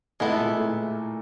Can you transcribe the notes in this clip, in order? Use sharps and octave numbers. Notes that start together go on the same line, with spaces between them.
A2 G#3 A3 B3 E4 A4
A#2 A#3
A2 A3